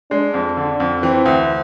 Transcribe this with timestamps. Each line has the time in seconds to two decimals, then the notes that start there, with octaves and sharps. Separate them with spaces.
0.11 G#3 D4
0.34 F2
0.57 D3
0.80 F2
1.03 E3 C4
1.26 D2